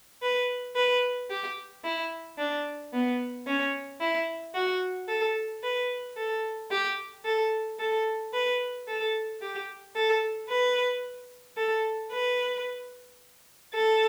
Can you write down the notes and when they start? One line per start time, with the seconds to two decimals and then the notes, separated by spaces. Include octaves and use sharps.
0.22 B4
0.76 B4
1.30 G4
1.84 E4
2.38 D4
2.93 B3
3.47 C#4
4.00 E4
4.55 F#4
5.08 A4
5.63 B4
6.17 A4
6.71 G4
7.25 A4
7.79 A4
8.33 B4
8.88 A4
9.42 G4
9.96 A4
10.49 B4
11.57 A4
12.11 B4
13.74 A4